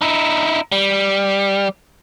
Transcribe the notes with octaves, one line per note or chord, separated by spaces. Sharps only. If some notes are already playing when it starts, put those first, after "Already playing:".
D#4 E4
G3